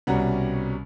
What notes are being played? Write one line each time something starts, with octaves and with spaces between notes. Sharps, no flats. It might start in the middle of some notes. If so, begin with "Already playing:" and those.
C2 B2 G3 C#4 F#5 A#5